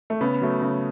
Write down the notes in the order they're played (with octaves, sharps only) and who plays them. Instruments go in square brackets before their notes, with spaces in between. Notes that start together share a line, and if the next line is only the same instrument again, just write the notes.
[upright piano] A3
C#3 B3
F#3 A3
C#3